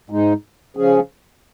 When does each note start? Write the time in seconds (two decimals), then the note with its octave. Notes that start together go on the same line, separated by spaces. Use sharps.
0.10 G#2 G#3 D#4
0.77 C#3 F3 C#4 G#4